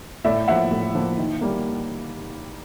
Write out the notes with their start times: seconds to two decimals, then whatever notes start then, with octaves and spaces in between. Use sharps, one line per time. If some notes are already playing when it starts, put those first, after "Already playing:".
0.24 A2 D5 E5
0.48 F3 A#3 E5 F#5
0.71 A2
0.95 F3 A#3
1.18 D#3
1.41 G3 A#3